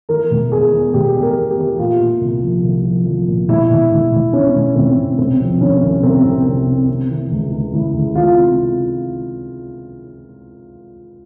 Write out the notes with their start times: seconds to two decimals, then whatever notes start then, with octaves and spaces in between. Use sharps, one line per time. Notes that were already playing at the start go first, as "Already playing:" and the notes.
0.09 E3 A#4
0.31 E1
0.51 E2 G#4
0.73 E2
0.94 E1 G4
1.16 E2
1.22 A#4
1.37 E2
1.51 G4
1.58 E3
1.79 A#2 F4
2.00 A#2
2.21 C2
2.42 F3
2.64 C2
2.84 F3
3.06 F3
3.28 A#2
3.49 E1 E4
3.70 E1
3.91 E1
4.12 E1
4.33 E2 C#4
4.55 E1
4.76 E1 C4
4.97 E1
5.18 C2 C4
5.40 F3
5.61 C2 C#4
5.82 C2
6.03 C2 C4
6.25 C2
6.46 C3
6.67 C3
6.88 C3
7.10 E3
7.31 C#2
7.51 C#2
7.73 C#2 E4
7.94 C#2
8.15 C#2 F4
8.36 C3